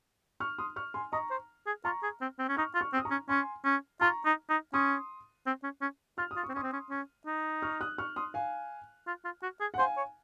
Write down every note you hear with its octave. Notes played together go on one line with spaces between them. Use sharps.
C#6 F6
C6 D#6
C#6 F6
G#5 C6
D#5 A#5 C#6
C5
G#4
F4 A#5 C#6
G#4
C4
C4
C#4
D#4 C#6 F6
F4
C#6 F6
C4
D#6
A#5 C#6
C#4
C#4 G#5 C6
C#4
F4 A#5 C#6
D#4
D#4
C#4 C6 D#6
C4
C#4
C#4
F4 F6
D#6
F4
C#6
C4
C#4 C6 D#6
C4
C#4
C#4
D#4
C#6 F6
D#6 F#6
C#6 F6
C6 D#6
F5 G#5
F4
F4
F#4
G#4
F#5
C5 F5 G#5
C#5